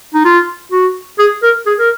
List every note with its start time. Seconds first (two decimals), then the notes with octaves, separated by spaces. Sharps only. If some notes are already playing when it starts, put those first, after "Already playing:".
0.15 D#4
0.25 F4
0.72 F#4
1.19 G#4
1.43 A#4
1.66 G#4
1.79 A#4